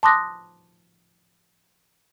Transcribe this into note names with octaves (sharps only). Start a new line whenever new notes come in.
A5 C6 D6 D#6 F#6 A#6